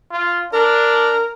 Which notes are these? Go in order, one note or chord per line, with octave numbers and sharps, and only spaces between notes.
F4
D4 A#4